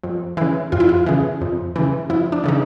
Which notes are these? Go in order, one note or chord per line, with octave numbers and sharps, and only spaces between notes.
F2
C#3 E3 E4
F2 F4
E4
F4
C#3 E3
F2
C#3 E3
F2 E4
D4
C#3 E3 D#4